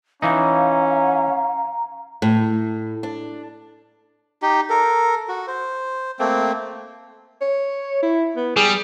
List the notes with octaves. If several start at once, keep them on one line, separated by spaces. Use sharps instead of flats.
E3 C#4 D#4 F5 A#5
A2
D4
D#4 G4
A4 A#4
F#4
C5
A3 A#3 C4
C#5
E4
B3
G3 G#4